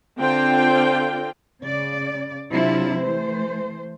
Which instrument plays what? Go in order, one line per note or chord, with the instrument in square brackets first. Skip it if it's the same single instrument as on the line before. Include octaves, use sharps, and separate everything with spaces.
[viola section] D3 C4 F4 G5
[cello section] C#3 D5
C3 F#3 D4 E4 F4
E3 A3 C5